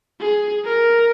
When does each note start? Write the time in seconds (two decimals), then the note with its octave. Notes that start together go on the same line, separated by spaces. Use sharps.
0.20 G#4
0.64 A#4